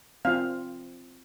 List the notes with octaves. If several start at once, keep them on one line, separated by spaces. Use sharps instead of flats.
C4 F4 F5